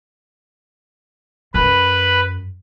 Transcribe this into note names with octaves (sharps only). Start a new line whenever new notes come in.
F#2 B4